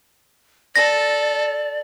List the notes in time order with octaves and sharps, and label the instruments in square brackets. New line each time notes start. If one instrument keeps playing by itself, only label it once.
[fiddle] A4 [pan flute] D5 [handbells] A#6